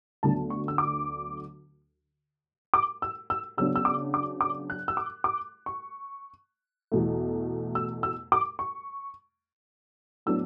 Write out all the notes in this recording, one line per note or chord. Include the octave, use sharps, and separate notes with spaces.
D2 D3 F#3 B3 D4 A5
C#6
E6
D6
D6
E6
E6
C#3 F#3 B3 D4 E6
E6
D6
D6
D6
F#6
E6
D6
D6
C#6
E2 B2 A3
E6
E6
D6
C#6
A2 F#3 B3 D4 E6